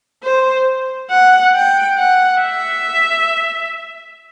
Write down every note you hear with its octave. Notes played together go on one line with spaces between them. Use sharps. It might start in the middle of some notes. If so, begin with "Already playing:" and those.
C5
F#5
G5
F#5
E5